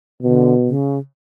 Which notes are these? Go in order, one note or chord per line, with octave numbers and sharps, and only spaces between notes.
B2 D3
C#3